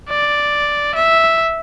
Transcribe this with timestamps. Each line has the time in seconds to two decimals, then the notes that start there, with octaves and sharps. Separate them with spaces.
0.09 D5
0.95 E5